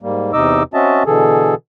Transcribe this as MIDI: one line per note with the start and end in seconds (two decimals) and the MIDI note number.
0.02 0.32 44
0.02 0.32 55
0.02 0.32 58
0.33 0.63 40
0.33 0.63 48
0.33 0.63 63
0.33 0.63 75
0.33 0.63 86
0.33 0.63 88
0.74 1.03 60
0.74 1.03 61
0.74 1.03 66
0.74 1.03 75
0.74 1.03 76
0.74 1.03 81
1.06 1.55 47
1.06 1.55 50
1.06 1.55 52
1.06 1.55 68
1.06 1.55 69